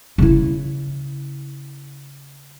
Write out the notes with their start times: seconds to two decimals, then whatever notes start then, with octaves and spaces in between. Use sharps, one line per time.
0.18 C#3 E4